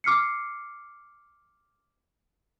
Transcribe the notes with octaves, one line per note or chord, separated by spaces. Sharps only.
D6 F6 C7 C#7